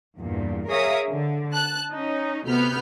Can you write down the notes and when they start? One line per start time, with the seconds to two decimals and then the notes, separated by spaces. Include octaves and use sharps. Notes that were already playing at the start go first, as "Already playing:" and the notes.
0.17 E2 G2 A#2
0.69 G#4 A#4 C#5 E5 F5 D#6
1.09 D3
1.52 A5 F#6
1.92 C#4 D#4
2.47 D2 C3 B3 B5 F6 G6